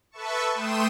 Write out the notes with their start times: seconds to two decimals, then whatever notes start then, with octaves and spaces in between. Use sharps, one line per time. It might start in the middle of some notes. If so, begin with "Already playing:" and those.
0.11 A4 B4 E5 A5 C#6
0.55 A3 G5 C6 D#6 E7